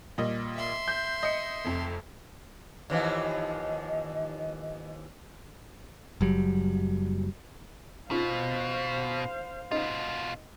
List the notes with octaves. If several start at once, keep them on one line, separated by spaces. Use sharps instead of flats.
A#2 G3 D#5
E5 C6
G6
D#5 C#7
F1 F2
D#2 E3 F3 D#5
F#1 F#3 G3
B2 F4 C5 F5
B2 D#4 F4